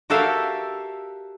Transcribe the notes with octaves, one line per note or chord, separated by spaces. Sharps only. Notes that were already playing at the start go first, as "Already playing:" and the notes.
F#4 G4 A4 A#4 E5 F5